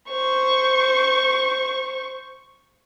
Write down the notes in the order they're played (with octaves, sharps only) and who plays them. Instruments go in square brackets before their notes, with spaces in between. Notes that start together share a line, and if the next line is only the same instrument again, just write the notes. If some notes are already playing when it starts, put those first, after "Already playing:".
[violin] C5 C#6